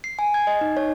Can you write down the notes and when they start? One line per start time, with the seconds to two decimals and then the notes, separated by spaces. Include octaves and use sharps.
0.04 C7
0.19 G#5
0.34 G#6
0.47 D#5
0.61 D#4
0.77 C#5